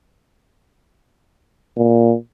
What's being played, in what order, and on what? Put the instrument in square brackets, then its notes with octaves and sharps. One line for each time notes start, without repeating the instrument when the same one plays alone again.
[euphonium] A#2